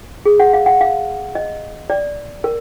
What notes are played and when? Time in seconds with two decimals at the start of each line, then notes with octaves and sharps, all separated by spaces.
0.25 G#4
0.40 F#5
0.53 F5
0.66 F#5
0.81 F5
1.35 D#5
1.90 D5
2.44 A#4